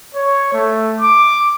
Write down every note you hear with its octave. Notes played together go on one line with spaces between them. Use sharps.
C#5
A3
D6